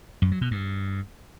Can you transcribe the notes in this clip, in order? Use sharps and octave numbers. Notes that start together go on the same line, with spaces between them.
F#2
F#3
B2
G2